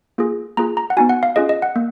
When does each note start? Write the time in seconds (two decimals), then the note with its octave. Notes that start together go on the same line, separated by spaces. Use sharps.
0.18 A#3 F4 G#4
0.57 A#3 F4 G#4 A#5
0.77 A#5
0.90 F#5
0.97 B3 D#4 F#4 G#5
1.09 F#5
1.23 F5
1.36 C#4 F4 G#4 D#5
1.49 D#5
1.62 F#5
1.76 A#3